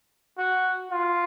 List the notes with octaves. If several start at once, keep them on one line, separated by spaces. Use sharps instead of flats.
F#4
F4